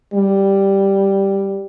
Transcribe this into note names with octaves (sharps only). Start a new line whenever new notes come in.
G3